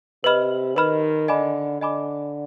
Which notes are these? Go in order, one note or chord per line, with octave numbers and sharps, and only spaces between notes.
C3 B4 D#5 B5 F6
D#3 B4 D#5 B5 F6
D3 D#5 G#5 B5 D6
D3 D#5 G#5 B5 D6